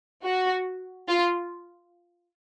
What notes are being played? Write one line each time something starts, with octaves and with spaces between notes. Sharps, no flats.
F#4
F4